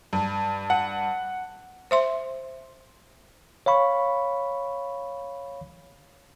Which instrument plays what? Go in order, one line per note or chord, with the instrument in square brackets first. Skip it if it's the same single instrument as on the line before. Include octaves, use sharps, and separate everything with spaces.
[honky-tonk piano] G2
[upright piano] F#5
[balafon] C5 E5 C6
[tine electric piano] C#5 F5 B5 C#6